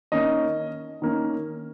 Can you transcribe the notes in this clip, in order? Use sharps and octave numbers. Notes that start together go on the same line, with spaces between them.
D#3 A#3 C#4 D#5
D#3 A#3 C#4